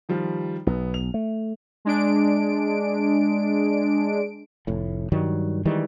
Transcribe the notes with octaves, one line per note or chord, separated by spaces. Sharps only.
D#3 F3 G3
B1 B3
F7
A3
G#3 D4 D7
F1 A2
G2 D#3 F#3 G3
D#3 E3 G3 G#3